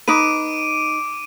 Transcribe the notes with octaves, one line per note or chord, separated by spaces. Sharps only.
D#4 B4 D6 D7 D#7